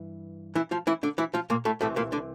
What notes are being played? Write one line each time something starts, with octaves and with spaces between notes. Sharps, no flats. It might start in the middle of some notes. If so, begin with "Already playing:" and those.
Already playing: G2 E3
E3 E4
F3 F4
E3 E4
D3 D4
E3 E4
F3 F4
A#2 A#3
A2 A3
C2 A2 C3 E3 A3
A#2 A#3
D3 D4